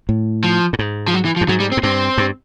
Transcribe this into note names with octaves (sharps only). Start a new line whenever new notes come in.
A2
F3
A2
G#2
F3
F#3
E3
F3
G2
G#2 F#3
G3
C4
G#2
G2 C4
G2